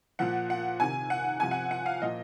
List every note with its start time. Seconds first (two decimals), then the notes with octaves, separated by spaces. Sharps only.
0.19 A#2 F3 F#5
0.50 F#5
0.80 C3 D#3 G#5
1.10 F#5
1.40 C3 F3 G#5
1.51 F#5
1.71 F#5
1.86 F5
2.02 A#2 F3 D#5